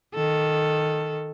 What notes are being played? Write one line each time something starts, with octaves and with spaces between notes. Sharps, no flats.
D#3 A4